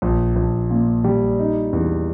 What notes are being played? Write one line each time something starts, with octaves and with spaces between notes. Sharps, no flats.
A#1
A#1
A#2
G3
D#4
E2